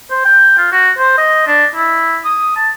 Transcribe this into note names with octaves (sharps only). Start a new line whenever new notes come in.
C5
G5
F4
F#4
C5
D#5
D4
E4
D#6
A5